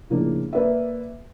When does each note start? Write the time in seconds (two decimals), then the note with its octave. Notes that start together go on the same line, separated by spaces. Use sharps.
0.10 A2 C#3 F3 A#3 D4
0.53 A#3 B4 D5 E5